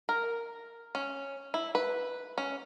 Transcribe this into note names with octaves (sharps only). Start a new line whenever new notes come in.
A#4
C#4
E4
B4
C#4